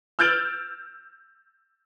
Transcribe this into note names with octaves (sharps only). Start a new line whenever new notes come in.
E6 F6 G6 A6 D7 F#7